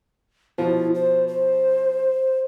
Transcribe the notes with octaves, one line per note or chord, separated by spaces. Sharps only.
B2 F3 E4
C5
C5